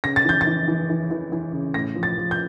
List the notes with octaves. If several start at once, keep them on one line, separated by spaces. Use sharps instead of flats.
C#3 A#6
A6
E3 G6
A6
E3
E3
E3
E3
E3
C#3
A2 A#6
F3
A6
F3
G6